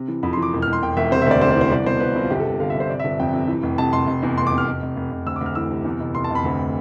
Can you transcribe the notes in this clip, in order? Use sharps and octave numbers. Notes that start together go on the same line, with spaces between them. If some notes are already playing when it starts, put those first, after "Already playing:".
Already playing: C3
E3
F2 B5
C6
E3
D6
E1
F6
E1
C6
E1 G5
E1 E5
C3 C5
E5
D2 D5
C3 C5
D5
E3
C5
C2 D5
B2 C5
C2 B4
C2 F4
G1 G4
A4
G1
D3 F5
E5
G1 C5
C3 D5
E5
G1
F2 G5
C3
E3
F1
F1 A5
F1 C6
F1
E2
F1 C6
D6
F1
F6
F1
F1
F1
F1
D2 E6
D6
D2
F6
E3 E6
C3
E2
F1
F1 C6
A5
F1 B5
D2